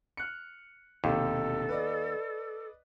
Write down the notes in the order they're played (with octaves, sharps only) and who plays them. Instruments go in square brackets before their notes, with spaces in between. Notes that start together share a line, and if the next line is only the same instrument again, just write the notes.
[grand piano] F6 F#6 C#7
[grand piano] E1 C3 [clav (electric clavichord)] D#2 [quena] A4
[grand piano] B4 D5 D#5